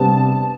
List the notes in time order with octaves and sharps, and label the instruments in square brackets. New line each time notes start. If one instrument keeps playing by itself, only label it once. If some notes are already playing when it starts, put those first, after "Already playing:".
Already playing: [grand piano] C3 G3 B3 D4 [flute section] A5